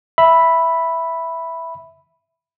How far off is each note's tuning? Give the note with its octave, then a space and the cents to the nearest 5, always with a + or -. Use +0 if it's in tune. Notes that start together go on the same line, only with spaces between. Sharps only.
E5 +0 B5 +0